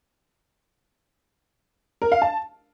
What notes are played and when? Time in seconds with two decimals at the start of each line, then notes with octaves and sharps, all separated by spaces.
2.02 A#4
2.12 F5
2.22 A5